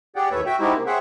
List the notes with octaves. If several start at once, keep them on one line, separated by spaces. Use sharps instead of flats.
G4 G#4 D5 F#5 G5
D#2 A2 A3 B4 C#5 E5
F#4 E5 G5
G#3 C4 D#4 E4 F#4 G4
C3 A#3
G#4 C5 C#5 E5 F#5 G5